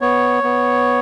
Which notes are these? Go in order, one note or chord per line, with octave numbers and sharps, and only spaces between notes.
B3 C#5
B3